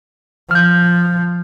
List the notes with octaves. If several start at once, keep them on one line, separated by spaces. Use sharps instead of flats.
F3 F6 G6